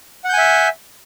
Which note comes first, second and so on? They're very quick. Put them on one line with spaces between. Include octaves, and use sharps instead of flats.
F#5 G6 G#5 E5